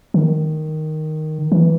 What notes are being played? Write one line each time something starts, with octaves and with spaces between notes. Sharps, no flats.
D#3
E3